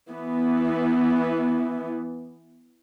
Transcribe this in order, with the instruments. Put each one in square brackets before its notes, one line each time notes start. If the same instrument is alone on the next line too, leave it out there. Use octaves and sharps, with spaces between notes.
[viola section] E3 B3